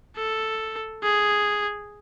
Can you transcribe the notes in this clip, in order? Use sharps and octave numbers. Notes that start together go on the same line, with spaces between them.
A4
G#4